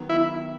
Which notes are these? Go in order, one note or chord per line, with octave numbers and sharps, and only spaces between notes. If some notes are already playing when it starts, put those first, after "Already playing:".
Already playing: D#3 F#3 B3
E4